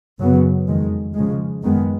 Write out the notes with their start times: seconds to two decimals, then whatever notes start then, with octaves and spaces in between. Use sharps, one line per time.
0.19 F#2 C#3 F#3 B3
0.67 F2 D#3 G#3
1.14 C#3 F3 G#3
1.62 F#2 D#3 G#3 B3